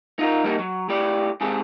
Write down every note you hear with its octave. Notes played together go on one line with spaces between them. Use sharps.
D#4 F4 A#4
G3 A#3 C#4 D#4
F#3
A2 G4 D5
G#2 C3 G#4 A4